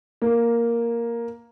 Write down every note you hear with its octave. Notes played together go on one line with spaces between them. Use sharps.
A#3